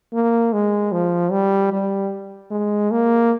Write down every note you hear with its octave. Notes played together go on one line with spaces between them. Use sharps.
A#3
G#3
F3
G3
G3
G#3
A#3